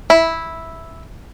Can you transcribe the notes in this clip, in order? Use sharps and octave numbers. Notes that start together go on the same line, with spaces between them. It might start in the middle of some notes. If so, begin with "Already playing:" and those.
E4